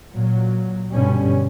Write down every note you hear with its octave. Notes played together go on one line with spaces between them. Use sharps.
A#2 F#3
G2 B2 D3 G3 C#4